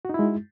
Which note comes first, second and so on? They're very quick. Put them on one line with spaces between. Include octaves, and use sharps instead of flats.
F#4 D#4 E4 G#3